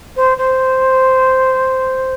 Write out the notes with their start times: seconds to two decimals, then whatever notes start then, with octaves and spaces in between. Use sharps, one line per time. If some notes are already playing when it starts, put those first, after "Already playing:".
0.16 C5
0.37 C5